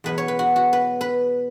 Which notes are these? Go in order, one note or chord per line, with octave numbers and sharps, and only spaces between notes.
E2 B2 F#3 B4
C#5
B4
F#4
F#4
B4
B4